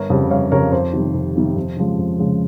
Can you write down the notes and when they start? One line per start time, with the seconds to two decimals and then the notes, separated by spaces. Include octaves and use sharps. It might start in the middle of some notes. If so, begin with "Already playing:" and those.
Already playing: G1 A#4 C#5
0.10 F2 C#3 G3
0.30 G1 C#5 F5
0.52 F2 C#3 G3 A#4 C#5
0.72 F2 C5
0.93 C3 D#3 G3
1.14 F2
1.36 C3 D#3 G3
1.56 F2
1.77 C#3 F3 G#3
1.98 F2
2.19 C#3 F3 G#3